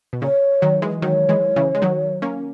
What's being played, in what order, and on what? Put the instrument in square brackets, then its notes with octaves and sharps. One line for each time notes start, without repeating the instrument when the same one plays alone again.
[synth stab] B2
[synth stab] A#2 C#3 [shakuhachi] C#5
[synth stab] D#3 F#3
E3 G#3
[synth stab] D#3 F#3 [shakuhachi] C#5
[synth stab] E3 G#3
C#3 E3
G#3
D#3 F#3
A#3 C#4